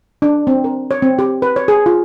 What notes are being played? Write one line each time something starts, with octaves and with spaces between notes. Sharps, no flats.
D4
C4
A#4
C#5
C4
G4
B4
C#5
G#4
F4